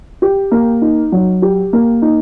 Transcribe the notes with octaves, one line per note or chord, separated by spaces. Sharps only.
G4
A#3
D#4
F#3
G4
A#3
D#4